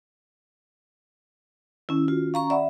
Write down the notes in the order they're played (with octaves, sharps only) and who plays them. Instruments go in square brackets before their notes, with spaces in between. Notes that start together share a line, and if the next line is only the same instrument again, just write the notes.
[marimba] D#3 C#4 [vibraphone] E4
[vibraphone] F4 [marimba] F#4
[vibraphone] C#4 A#5 C#6 [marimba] F5
[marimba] D5 F#5 B5 [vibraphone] E5